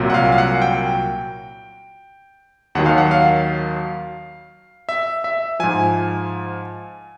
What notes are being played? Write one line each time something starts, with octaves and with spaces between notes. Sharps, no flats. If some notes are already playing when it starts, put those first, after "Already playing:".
Already playing: C2 A#2 F#3
F#5
F5
F5
F#5
G5
D#2 D#3 F#3 F#5
F5
F#5
F5
E5
E5
G#2 F3 G#5